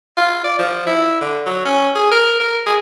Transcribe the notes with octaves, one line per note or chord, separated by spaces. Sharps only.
F4
D5
F3
E4
D3
F#3
C#4
G#4
A#4
A#4
G#4